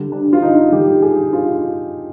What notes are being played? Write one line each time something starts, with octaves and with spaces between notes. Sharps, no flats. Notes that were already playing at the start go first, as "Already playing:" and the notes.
Already playing: D3 G3
D4
F4
D#4
D3 G3 G4
G#4
F4